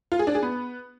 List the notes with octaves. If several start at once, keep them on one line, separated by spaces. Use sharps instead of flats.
F4
G#4
D4
G#4
B3